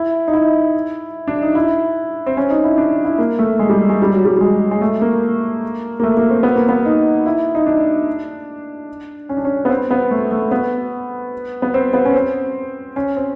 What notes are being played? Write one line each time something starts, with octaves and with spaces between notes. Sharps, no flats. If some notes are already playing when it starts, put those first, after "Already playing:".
Already playing: E4
D#4
E4
D4
D#4
E4
C4
C#4
D#4
E4
D4
E4
A#3
A3
G#3
G3
G#3
G3
F#3
G3
G3
G#3
G#3
A3
A#3
A#3
A3
A#3
C4
B3
A#3
B3
D#4
E4
D#4
D4
C#4
D4
C#4
B3
C4
B3
A3
A3
B3
B3
C4
B3
C#4
C4
C#4
C4